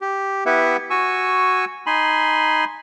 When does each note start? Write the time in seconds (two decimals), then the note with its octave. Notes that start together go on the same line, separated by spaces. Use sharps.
0.01 G4
0.46 B3 E4 G4 B4 E5 F#5
0.90 F#4 G#5 C#6 E6
1.87 D#4 G#5 B5 C6